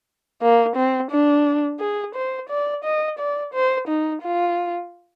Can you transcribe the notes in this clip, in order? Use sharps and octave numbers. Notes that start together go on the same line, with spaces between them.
A#3
C4
D4
G#4
C5
D5
D#5
D5
C5
D#4
F4